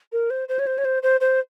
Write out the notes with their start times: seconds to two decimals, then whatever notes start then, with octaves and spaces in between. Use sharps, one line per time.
0.12 A#4
0.30 C5
0.49 C5
0.59 C#5
0.67 C5
0.78 C#5
0.85 C5
1.03 C5
1.21 C5